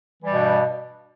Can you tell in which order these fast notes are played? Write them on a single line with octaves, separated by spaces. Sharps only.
E3 G3 G2 B2